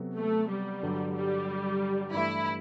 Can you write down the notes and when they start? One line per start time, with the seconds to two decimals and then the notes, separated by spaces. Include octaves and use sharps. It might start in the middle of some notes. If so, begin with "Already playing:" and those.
Already playing: C3 F#3 B3 F#4 A4
0.17 A3
0.50 G3
0.83 G2 D3 F#3
1.16 G3
2.14 G2 E3 A3 E4